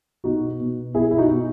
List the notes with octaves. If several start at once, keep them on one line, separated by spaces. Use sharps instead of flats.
B2 D#4 F#4
B2
B2 E4 G#4
E4
D#4 F#4
B2